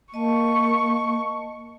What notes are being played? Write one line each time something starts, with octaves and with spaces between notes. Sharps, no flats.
A#3 D#5 A5 C#6